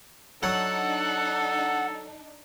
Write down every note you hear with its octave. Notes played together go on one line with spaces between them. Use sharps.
F#3 D4 D#4 A4 F#5